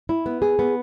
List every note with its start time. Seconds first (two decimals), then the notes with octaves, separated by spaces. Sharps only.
0.09 E4
0.26 B3
0.42 G#4
0.59 B3